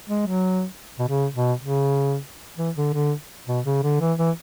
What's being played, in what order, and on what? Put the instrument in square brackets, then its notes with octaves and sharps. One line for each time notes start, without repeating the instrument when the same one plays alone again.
[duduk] G#3
F#3
B2
C#3
B2
C#3
E3
D3
D3
B2
C#3
D3
E3
E3